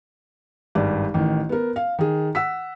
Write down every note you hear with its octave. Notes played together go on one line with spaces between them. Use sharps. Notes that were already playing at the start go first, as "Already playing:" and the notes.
G#1 G2 D5
A1 D#3
B3 A#4
F5
D#3 G#4
F#5 E6 B6